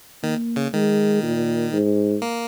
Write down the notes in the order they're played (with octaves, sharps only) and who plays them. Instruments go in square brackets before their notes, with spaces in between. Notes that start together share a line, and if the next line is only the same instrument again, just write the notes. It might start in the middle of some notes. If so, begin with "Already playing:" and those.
[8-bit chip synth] D#3 [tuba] A#3
[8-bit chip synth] C#3
[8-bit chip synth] D#3 [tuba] G#3
[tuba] A#2
G#2
[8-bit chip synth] A#3